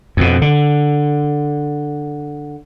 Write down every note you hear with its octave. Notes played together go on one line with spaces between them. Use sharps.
F2 B2
D3